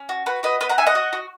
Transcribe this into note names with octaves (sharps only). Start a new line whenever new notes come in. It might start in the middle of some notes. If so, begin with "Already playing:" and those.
Already playing: C#4
F#4
F#4 B4
F#4 B4 D#5
B3 B4 D#5
F#5 A#5
D#4 E5 G#5
D#5 F#5
F#4
F#4